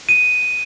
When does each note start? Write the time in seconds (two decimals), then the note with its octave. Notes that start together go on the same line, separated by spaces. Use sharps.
0.09 D#7